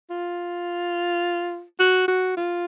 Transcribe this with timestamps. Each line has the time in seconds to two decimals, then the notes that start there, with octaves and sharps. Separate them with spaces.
0.10 F4
1.79 F#4
2.08 F#4
2.37 F4